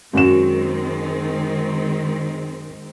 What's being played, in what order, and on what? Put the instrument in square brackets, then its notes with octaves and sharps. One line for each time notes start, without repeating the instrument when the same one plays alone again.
[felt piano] F#2 F#4 E7 [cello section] D#3 G#3 C4